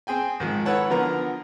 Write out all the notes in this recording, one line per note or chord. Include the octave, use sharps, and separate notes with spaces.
C4 G#4 G5 G#5
G#2 D#3 F3
E4 A4 B4 C#5 F#5 A5
D3 F3 B3 A#4 A#5